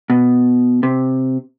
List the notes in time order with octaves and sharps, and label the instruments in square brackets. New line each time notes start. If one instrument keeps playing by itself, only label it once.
[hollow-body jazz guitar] B2
C3